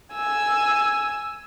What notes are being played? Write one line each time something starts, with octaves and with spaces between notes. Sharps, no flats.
G#5 E6